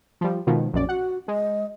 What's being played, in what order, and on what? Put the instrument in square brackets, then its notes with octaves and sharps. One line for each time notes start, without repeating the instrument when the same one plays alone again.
[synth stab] F3 G3
[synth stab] B2 D#3 F3 [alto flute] G#3
[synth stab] A#1 F#2 D5 [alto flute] C#4
[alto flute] F#4 [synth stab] F#5
[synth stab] G#3 [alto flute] D#5